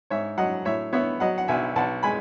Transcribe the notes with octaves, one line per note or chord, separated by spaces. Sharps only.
G#2 C#5 E5
F#3 D#5 F#5
A2 C#5 E5
B3 C#5 E5
F#3 D#5 F#5
F#5
B1 E5 G#5
B1 F#5 A5
G#3 G#5 B5